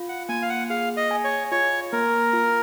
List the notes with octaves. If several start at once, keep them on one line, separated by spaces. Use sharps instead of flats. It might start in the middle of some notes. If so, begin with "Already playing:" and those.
Already playing: F4
F#5
A#3 G#5
F5
F#5
G#4 F5
D#5
G#5
C#5
F4 C#5
A#3 A#4
F4